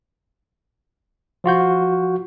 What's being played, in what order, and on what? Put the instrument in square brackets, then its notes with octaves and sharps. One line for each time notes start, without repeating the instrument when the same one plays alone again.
[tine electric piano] F3 F4 F#4 G6